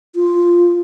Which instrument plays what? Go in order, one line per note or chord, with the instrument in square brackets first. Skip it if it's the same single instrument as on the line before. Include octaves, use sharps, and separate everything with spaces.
[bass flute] F4